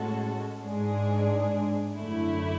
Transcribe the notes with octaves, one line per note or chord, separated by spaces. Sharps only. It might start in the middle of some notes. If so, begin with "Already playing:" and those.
Already playing: A2 G#3 C#4 F#4 A4
G#2 G#3 D4 G#4
F#2 D3 A3 E4